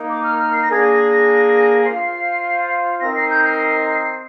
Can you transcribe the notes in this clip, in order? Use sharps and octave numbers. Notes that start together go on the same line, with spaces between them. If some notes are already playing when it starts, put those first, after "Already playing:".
Already playing: A#3 D#4 A#4
D6
F6
F6
C7
A#6
A#3 D4 G#4 G#6
A#6
F4 C5 F5 C7
C4 D#4 A#4 D#5 A#6
C7
G6
C7